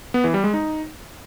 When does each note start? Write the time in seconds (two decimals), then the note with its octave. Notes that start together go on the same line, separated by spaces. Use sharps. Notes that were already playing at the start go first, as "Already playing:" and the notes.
0.14 B3
0.24 E3
0.34 G3
0.44 G#3
0.54 D#4